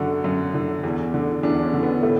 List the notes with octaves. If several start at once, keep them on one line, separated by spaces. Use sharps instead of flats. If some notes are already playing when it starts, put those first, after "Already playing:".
Already playing: F#2 D3 F#4
F#2
D3
E2
D3
E2 D4
C#4
D3
B3
A2 A3